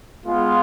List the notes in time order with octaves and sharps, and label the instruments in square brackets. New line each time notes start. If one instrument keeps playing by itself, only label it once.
[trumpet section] G#3 B3 F4